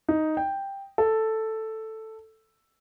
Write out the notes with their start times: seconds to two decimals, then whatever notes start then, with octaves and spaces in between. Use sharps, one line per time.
0.09 D#4
0.37 G5
0.98 A4